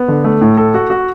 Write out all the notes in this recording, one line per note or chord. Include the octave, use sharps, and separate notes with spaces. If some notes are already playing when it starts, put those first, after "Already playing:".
Already playing: B3
D3
A3
A2
A4
F#4
F#4